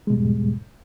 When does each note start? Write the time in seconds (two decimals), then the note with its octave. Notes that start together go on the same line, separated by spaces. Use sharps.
0.07 G#3
0.10 B2
0.13 G3
0.16 E2
0.19 G#2